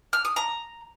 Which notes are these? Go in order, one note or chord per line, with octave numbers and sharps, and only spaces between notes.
F6
D#6
A#5